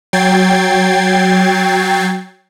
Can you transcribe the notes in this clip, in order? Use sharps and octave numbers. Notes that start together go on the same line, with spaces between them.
F#3 G5 G#6 A6 C7